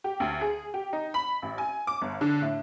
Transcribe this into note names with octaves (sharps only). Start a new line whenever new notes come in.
G4
D2
G#4
G4
D#4
B5
A1
G#5
D6
G1
D3
A2